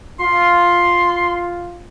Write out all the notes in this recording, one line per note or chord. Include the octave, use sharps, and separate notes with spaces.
F4 C6